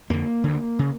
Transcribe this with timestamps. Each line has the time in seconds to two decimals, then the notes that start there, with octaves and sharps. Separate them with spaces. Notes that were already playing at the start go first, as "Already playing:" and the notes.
0.10 F2 D3 A#3
0.44 D2 D3
0.79 C#3